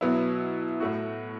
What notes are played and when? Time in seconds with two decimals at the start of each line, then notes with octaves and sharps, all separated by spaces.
0.01 B2 F#3 B3 E4
0.80 A2 A3 F#4